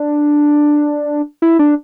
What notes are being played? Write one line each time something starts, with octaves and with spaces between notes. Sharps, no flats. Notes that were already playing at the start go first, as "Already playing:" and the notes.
Already playing: D4
E4
D4